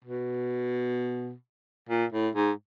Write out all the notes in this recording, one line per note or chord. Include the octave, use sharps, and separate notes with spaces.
B2
A#2
A2
G#2